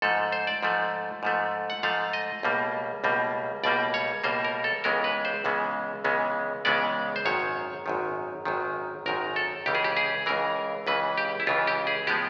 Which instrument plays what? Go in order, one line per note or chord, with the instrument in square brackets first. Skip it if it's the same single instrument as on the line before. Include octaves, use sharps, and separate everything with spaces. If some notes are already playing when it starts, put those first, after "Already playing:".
[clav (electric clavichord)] G#2 F3 A3 A4
C5
D5
G#2 F3 A3
G#2 F3 A3
F#5
G#2 F3 A3 F5
D#5
C#2 B2 G3 A#3
C#2 B2 G3 A#3
C#2 B2 G3 A#3 D5
C#5
C#2 B2 G3 A#3 C5
A#4
A4
C#2 C#3 E3 G#3 B3 A#4
B4
C5
C#2 C#3 E3 G#3 B3
C#2 C#3 E3 G#3 B3
C#2 C#3 E3 G#3 B3 D5
C5
G#1 F#2 D#3 C#5
G#1 F#2 D#3
G#1 F#2 D#3
G#1 F#2 D#3 A#4
A4
C#2 C#3 E3 G4
G#4
G4
G#4
C#2 C#3 E3 A#4
C#2 C#3 E3 B4
G4
E4
C#2 C#3 E3 F4
G4
G#4
A2 F3 G#3 B3 G4